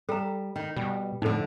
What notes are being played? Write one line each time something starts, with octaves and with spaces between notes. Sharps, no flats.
G3 A4 A#5
D#3
B2 G3
F2 A2 D3 D#4 A4